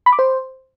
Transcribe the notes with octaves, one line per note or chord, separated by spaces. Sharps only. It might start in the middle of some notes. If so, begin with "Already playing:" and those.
B5
D6
C5